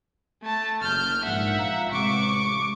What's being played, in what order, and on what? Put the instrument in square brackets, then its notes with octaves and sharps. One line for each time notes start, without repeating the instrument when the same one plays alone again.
[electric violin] A3 A5
[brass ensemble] F#1 [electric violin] F6 G6
[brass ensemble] A#1 G#2 [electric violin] E5 F#5
[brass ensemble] F4 F5 A#5
[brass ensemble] A1 C3 G#3 [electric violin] C#6 D6